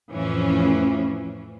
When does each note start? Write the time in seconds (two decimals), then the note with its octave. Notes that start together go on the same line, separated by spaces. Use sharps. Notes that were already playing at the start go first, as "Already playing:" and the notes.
0.10 F2 A2 E3 F3 C#4